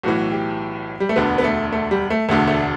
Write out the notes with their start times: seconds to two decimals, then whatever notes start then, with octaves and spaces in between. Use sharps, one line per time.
0.03 B1 A2 E3 F#4
0.32 G4
1.00 G3
1.09 A3
1.16 E1 D2 D3 B3
1.38 B3
1.44 A3
1.72 A3
1.91 G3
2.10 A3
2.29 E1 D2 D3 A3
2.47 A3